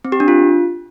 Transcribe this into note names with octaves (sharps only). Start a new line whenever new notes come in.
C4
G4
D4
F4